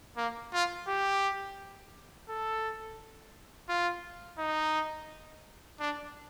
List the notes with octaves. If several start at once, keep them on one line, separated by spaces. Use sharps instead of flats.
A#3
F4
G4
A4
F4
D#4
D4